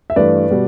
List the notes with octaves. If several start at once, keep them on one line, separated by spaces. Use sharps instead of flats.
E5
G2 E3 A3 B4 D5
B2 G3